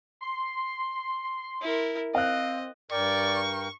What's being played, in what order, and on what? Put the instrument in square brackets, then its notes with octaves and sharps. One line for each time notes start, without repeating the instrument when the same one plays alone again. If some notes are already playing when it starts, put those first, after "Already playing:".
[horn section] C6
[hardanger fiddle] E4 A#4
[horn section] C4 [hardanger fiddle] D#5 [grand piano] F5 F#6
[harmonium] G2 A#4 G5 [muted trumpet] D5 [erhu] C#6